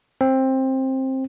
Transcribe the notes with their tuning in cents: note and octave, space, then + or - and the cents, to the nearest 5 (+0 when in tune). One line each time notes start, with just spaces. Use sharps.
C4 +15